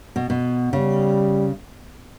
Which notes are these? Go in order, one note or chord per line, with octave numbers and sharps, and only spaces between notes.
B2
B2
C#3 G3